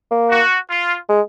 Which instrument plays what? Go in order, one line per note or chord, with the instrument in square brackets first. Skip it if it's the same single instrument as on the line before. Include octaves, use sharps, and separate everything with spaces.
[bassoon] A#3
[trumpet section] F#4
F4
[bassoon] G#3